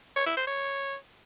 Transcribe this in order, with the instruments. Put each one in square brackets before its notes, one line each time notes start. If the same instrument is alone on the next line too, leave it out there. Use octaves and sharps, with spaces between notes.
[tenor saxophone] C#5
E4
C5
C#5